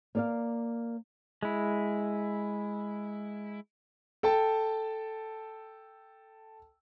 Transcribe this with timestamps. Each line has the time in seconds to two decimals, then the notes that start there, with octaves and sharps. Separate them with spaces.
0.15 A#3 D5 F5
1.43 G#3 E4
4.23 A4 G5 A5